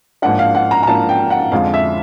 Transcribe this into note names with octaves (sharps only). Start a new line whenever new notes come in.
G#2 F3 A#3 D4 F#5
F5
F#5
A#5
A#5
G#2 F3 A#3 D4 A5
G5
F#5
F2 D3 F3 G#3 F5
E5